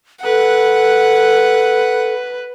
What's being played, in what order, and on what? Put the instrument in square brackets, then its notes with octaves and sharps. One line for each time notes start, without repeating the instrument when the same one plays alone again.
[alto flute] A4 [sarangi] B4 [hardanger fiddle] F#5